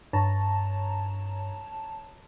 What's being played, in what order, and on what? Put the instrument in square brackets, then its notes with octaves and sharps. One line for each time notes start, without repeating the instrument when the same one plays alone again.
[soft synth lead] G2 [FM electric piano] C#5 A5 A#5